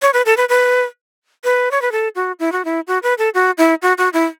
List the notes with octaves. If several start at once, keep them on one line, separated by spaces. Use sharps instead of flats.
C#5
B4
A4
B4
B4
B4
C#5
B4
A4
F#4
E4
F#4
E4
F#4
B4
A4
F#4
E4
F#4
F#4
E4